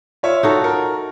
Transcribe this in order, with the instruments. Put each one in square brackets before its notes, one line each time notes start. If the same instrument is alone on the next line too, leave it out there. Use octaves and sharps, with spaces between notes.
[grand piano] F4 C#5 E5
[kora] D#4 F#4 A4
[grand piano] A#4